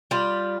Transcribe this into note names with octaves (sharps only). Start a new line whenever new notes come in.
G3 F4